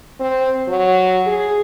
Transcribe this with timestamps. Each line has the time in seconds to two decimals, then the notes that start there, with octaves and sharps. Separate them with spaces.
0.20 C4
0.68 F#3
1.26 G#4